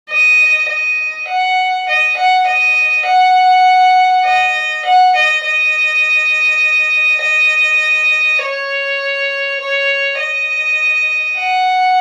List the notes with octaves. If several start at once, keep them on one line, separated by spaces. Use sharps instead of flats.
D#5
D#5
F#5
D#5
F#5
D#5
F#5
D#5
F#5
D#5
D#5
D#5
C#5
C#5
D#5
F#5